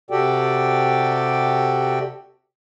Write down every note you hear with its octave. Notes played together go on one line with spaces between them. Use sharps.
C3 F#4 G4 A4 D5 G5